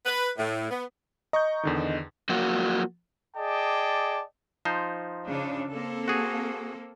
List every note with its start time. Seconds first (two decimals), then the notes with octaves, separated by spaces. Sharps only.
0.06 B4
0.37 A2
0.71 B3
1.33 D#5 A#5 C#6 G6
1.63 E2 D3 D#3
2.29 F3 F#3 A#3 F4 F#4
3.36 G#4 D5 D#5 G5 A5 D6
4.65 F3 D#4 C5
5.25 C#3 D4
5.70 A#3 C4 A4
6.08 F#4 G#4